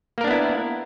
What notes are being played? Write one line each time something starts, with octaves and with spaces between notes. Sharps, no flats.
A#3 B3 D4 E4 A#4